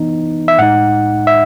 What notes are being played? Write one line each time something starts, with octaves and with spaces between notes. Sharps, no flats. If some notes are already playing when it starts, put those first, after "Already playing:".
Already playing: E3 B3 D#4
E5
A2 G#3 D#4 F#5
E5